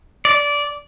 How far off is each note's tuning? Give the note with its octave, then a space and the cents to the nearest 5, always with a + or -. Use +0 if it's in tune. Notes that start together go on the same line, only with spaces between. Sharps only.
D5 -15